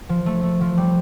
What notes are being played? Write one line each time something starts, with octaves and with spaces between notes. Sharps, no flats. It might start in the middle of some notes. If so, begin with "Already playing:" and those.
F3
A3
A3
F3
G3